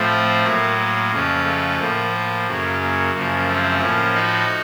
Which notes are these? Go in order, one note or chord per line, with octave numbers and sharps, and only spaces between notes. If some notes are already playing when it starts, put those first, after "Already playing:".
Already playing: A2 F3 A3 C4
A2 F#3 A#3
A#3
F2 C#3 F3
A3
A2 F3 A#3
A#3
F#2 C#3 F#3
A#3
F#2 C#3 F3 A#3
A3 C4
A2 F3 A#3 C#4
D#4 F#4